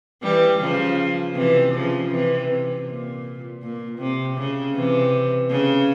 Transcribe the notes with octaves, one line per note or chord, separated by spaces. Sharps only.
E3 G3
C#3 F3
C3 E3
C#3 F3
C3 E3
C3
A#2
A#2
C3
C#3
C3 E3
C#3